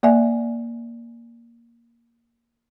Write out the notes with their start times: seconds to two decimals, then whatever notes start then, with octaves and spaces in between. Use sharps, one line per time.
0.03 A#3 D5 E5 G#5